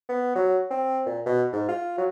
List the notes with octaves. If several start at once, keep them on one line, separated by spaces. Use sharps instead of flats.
B3
F#3
C4
A#2
B2
G#2
F4
F#3